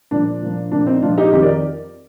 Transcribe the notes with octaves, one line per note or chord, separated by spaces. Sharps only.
A#2 F3 D4
A#2 F3
A#2 F3 D4
C4 D#4
A#2 F3 D4 F4
D#4 G4
F2 D#3 D#4 G4
A#4 D5